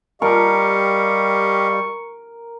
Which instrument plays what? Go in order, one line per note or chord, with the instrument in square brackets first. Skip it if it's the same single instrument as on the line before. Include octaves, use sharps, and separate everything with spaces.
[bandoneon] G3 [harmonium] G4 D#5 F5 [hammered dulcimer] A#4 [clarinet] C#6